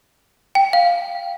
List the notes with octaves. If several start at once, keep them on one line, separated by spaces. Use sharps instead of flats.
G5
F5